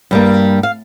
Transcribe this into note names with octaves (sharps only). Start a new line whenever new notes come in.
G2 G3 A#3
F5